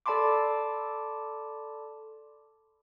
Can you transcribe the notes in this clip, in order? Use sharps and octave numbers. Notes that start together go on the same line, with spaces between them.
A4 D5 A5 B5 C6 D6